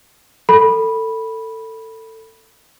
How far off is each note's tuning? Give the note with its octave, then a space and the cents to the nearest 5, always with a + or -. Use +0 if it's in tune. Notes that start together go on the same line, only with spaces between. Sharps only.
A4 +25 B5 -10